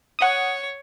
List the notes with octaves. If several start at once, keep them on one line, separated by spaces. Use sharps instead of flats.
C#5 F#5 D#6